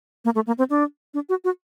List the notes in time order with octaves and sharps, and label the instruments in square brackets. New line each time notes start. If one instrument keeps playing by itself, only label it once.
[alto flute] A#3
A3
A#3
C4
D4
D4
F#4
F#4